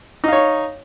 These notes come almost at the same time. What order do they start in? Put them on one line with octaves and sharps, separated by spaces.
D#4 F5 C#5